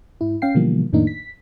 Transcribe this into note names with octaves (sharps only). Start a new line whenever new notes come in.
G#2 E4
C#4 F5 G5 C7
B2 D3 E3 F3 G3 A#3
F2 A2 D#3 A#3 D4 D#4
B6